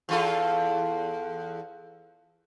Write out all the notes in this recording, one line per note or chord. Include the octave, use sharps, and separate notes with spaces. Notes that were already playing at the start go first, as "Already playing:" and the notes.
E2 F4 A4